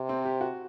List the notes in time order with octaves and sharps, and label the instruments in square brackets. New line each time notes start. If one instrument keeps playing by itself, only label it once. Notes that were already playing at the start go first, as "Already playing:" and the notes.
Already playing: [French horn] C3
[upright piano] C4
G4
F#4